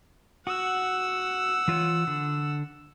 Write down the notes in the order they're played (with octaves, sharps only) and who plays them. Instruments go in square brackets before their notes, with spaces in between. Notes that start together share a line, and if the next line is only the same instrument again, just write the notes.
[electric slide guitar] F#4 [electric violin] F#5 E6
[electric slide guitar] E3 F4 C#5
D3